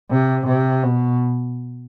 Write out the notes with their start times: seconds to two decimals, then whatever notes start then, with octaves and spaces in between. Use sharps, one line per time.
0.11 C3
0.47 C3
0.83 B2